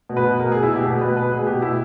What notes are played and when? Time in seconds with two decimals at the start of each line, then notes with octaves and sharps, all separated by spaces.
0.09 B2
0.17 B4
0.25 B2
0.39 B2 A#4
0.52 B2 G#4
0.63 E4
0.70 B2 G4
0.86 B2 G#4
1.01 B2 B4
1.16 B2 B4
1.32 B2 G#4
1.47 B2 G4
1.62 B2 E4